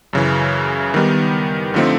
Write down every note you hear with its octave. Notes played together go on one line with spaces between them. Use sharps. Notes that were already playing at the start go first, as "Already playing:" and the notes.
F#2 C#3 E3
D#3 G3 B3 D#4
D3 F3 A3 C4 D#4